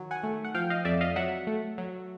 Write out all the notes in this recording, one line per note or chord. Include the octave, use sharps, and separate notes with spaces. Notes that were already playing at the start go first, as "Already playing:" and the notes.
Already playing: D#3 F#3
F#5 G#5
A3
F#5
F3 F5 G5
D#5 F5
F2 D5 E5
D#5 F5
F#3 E5 F#5
A3
F#3